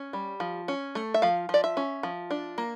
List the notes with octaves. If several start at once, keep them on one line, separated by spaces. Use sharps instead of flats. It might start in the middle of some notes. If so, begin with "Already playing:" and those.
Already playing: C#4
G3
F3
C#4
A3
E5
F3 F5
F3 D5
E5
C#4
F3
D4
A#3